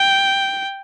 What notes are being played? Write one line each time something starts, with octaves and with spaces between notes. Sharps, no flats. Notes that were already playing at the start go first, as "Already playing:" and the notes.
Already playing: G5